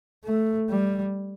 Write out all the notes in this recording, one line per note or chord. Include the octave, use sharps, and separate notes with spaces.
A3
G3